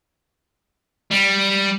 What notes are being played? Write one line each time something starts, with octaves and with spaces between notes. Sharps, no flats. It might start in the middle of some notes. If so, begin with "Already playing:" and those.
G3